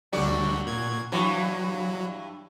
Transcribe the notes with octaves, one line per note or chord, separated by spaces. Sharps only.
D2 D3 F#3 G3 F#4 D5
A#2 G#6
G2 E3 F#3